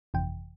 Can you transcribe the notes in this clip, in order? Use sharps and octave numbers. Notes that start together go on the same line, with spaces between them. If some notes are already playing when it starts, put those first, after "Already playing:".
G1 F2 C3 E3 G5